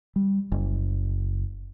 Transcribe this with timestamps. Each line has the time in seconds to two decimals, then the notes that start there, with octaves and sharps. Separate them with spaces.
0.16 G3
0.52 F#1